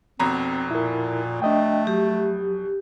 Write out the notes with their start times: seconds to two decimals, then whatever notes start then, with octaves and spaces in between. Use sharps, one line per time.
0.20 F1 B2 C4 A#5
0.71 A#2 E4 A#4
1.42 A3 D4 D#5 G5
1.87 F#3 G4